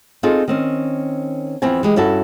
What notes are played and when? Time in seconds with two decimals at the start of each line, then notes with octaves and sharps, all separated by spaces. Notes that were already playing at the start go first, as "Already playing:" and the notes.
0.23 C4 D#4 F4 G#4 A4
0.48 D#3 C4 C#4
1.62 E2 E3 F3 C4 E4 G#5
1.83 E3 G#3 G4
1.96 G2 C#4 E4 F#4 A4